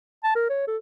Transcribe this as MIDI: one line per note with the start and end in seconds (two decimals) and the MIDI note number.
0.24 0.33 81
0.35 0.49 70
0.49 0.67 73
0.68 0.77 69